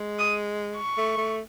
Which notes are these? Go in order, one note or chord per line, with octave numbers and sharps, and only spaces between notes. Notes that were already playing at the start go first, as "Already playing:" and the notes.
Already playing: G#3
D#6
C#6
A3
A3